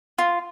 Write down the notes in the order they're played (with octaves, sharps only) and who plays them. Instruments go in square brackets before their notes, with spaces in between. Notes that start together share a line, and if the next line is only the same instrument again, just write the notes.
[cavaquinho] F4